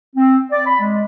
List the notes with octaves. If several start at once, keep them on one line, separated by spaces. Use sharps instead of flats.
C4
D5
B5
G#3